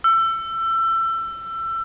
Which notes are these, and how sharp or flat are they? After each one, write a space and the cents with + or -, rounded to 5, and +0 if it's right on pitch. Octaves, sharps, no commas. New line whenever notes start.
E6 +25